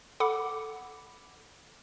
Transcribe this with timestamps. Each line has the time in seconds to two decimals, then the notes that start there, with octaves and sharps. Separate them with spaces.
0.20 A4 F#5 B5 D6